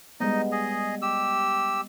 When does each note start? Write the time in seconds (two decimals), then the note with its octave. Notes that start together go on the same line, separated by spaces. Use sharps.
0.20 G3 G#3 B3 D#4 D#5
0.52 G#4 D#5
1.02 G4 E6